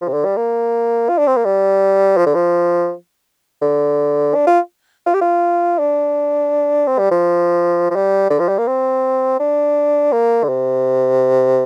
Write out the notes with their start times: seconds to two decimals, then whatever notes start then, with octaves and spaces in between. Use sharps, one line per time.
0.01 F3
0.08 C3
0.13 D3
0.25 G3
0.37 A#3
1.09 F4
1.18 D4
1.27 C4
1.37 A#3
1.45 G3
2.17 F3
2.26 D3
2.35 F3
3.62 D3
4.34 D4
4.47 F4
5.06 F4
5.14 G4
5.21 F4
5.79 D4
6.87 C4
6.99 G3
7.11 F3
7.91 F3
7.96 G3
8.30 D3
8.39 F3
8.48 G3
8.58 A#3
8.67 C4
9.40 D4
10.12 A#3
10.44 D3
10.49 C3